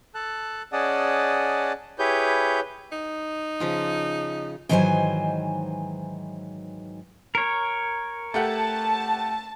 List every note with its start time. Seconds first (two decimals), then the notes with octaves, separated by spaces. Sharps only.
0.15 A4 A5 F#6
0.72 C#4 G#4 D5 D#5 F#5 A5
1.99 E4 G4 G#4 B4 C#5 G6
2.92 D#4
3.60 C#3 F3 F4
4.69 G#2 D#3 E3 F#3 C5 G#5
7.35 A#4 C#5
8.34 A3 G4 F#5 A5